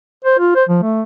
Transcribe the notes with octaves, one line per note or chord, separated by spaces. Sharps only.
C5
F4
C5
F3
A3